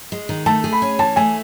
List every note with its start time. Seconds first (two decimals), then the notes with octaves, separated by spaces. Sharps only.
0.12 G#3
0.29 D#3
0.46 A3 A5
0.64 G#4
0.73 B5
0.82 C#4
0.99 E3 A5
1.16 A3 G#5